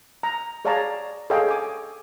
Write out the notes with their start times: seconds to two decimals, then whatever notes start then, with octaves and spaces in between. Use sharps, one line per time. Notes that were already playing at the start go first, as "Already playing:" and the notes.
0.23 A#5
0.65 G#4 C#5 D5 F5 A5 A#5
1.30 G#4 A4 C#5 D#5 F5 G5
1.48 G#5 D6